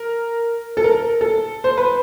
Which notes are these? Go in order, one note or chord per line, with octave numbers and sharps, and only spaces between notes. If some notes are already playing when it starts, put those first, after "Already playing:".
Already playing: A#4
A4
A#4
A4
C5
B4